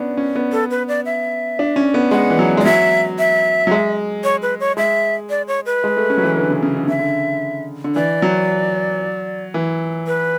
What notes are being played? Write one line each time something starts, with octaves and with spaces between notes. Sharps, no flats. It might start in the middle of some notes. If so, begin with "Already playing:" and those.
Already playing: B3 C#4 D4
C#4
B3
A4
B4
D5
E5
D4
C#4
B3
G#3 F#5
E3
F#3
G#3
D5
F#3 E5
E5
F#3
G#3
C#5
B4
C#5
G#3 E5
D5
C#5
B4
G#3
A3
C#4
F#3
E3
D3
C#3
C#3
D3
C#3 E5
D3
D3
E3 D5
F#3
E3
B4